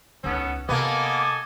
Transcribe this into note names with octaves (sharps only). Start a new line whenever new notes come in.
C#2 B3 C#4 D#4 A4
C3 A#3 B3 A4 D#5 G#5 D6